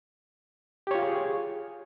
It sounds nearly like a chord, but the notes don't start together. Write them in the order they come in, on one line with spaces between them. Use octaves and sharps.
G4 C#5 F4 F5 G#4